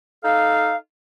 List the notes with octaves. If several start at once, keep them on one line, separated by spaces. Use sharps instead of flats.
D#4 A4 F5